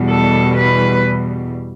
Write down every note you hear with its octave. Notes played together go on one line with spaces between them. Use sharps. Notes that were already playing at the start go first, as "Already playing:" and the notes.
Already playing: E2 B2 G3
A4
B4